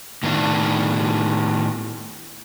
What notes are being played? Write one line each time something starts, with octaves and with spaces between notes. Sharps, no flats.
A2 D#3 B3 D4